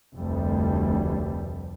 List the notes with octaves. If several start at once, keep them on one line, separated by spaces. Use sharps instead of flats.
F1 D2 G3